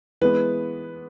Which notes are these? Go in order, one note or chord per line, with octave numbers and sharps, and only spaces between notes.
E3 G#3 B3 B4